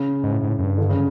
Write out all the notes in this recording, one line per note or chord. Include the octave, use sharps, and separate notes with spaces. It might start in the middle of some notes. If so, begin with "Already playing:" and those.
Already playing: C#3
G#2
A2
G#2
A2
F#2
G2
D3
C#3